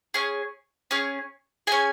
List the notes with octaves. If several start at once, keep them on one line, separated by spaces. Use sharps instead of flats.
C#4 G#4
C#4 G#4
C#4 G#4 G#5